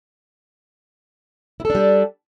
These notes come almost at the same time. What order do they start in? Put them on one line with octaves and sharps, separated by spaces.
E4 A4 D4 G3